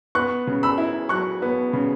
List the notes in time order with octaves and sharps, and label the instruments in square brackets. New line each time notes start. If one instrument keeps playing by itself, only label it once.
[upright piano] B3 C#6 F#6
C#3
B5 E6
E4
F#3 C#6 F#6
B3
C#3